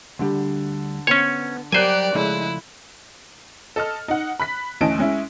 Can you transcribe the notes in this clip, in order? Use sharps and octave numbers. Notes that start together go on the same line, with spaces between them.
D2 D3 G3
B3 C#4 C5 C#5 G#5
F#3 G3 G4 A#4 C5 D5 G#5 F#6
C#3 F3 G#3 A3 E4
A4 D#5 A5 F6
D#4 F#5
B5 F#6 B6
D2 E3 C#4 D#5 A5 D7
G#3 C#4 E4